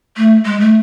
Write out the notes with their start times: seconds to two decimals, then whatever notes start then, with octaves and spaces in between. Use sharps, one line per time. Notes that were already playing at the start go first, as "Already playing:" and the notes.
0.17 A3
0.45 G#3
0.60 A3